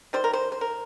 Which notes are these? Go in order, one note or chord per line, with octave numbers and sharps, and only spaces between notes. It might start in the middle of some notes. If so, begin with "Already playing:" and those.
D#3 G3 C5
A#4
C5
C5
A#4